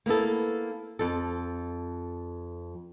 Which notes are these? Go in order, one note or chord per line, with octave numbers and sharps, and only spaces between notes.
A#3 B3 E4 A4
F2 A4